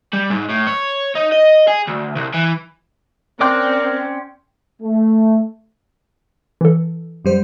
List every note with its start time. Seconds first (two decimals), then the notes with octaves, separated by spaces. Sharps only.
0.13 G3
0.31 G#2
0.50 A2
0.68 C#5
1.15 D#4
1.32 D#5
1.68 G#4
1.87 D2
2.16 C2
2.34 E3
3.41 C4 C#4 A#4 D5 G5 C6 D6 F#6
4.82 A3
6.61 E3 A4
7.25 F#2 G3 C5